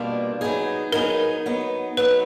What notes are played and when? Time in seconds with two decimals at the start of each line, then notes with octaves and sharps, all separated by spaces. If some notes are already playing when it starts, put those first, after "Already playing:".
Already playing: B2 G3 A#3 D4 F4
0.41 F#3 B3 D#4 G#4
0.92 F#3 B3 D#4 G#4 A#4
1.46 F#3 B3 D#4
1.97 F#3 B3 D#4 B4